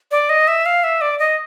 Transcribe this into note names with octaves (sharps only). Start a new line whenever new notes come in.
D5
D#5
E5
F5
E5
D5
D#5